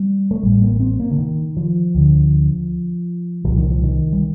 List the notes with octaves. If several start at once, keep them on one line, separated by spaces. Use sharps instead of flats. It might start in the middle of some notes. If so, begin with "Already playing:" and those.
Already playing: G3
A3
A1 A2 G3
A#3
C4
A#3
D3
D#3
F3
D2 D3
C2 A#2 F3
D#3
F3
D#3
G3